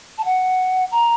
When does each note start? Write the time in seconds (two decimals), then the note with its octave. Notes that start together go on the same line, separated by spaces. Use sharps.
0.18 A5
0.25 F#5
0.92 A#5